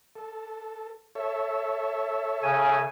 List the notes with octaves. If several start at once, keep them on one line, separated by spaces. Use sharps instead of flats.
A4
A4 C#5 E5
C#3 G#5